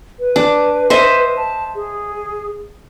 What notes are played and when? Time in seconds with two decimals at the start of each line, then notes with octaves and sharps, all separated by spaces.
0.20 B4
0.36 D4
0.90 C5 D#5 E5
1.37 A5
1.76 G#4